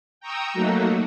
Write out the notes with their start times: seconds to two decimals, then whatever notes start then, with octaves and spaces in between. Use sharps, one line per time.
0.21 G5 A#5 C#6 D#6 E6
0.54 F#3 A3 A#3 D#4 F#4